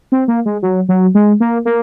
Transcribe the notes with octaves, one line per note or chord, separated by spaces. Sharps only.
C4
A#3
G#3
F#3
F#3
G#3
A#3
A#3